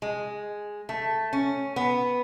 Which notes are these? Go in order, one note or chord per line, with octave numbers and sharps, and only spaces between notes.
G#3
A3
C#4
B3